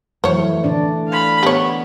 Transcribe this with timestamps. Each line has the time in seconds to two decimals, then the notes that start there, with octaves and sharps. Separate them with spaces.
0.24 F2 E3 F#3 A3 C5 C#5
0.64 A2 D3 D4 D5
1.08 F5 B5
1.43 B3 G4 C#5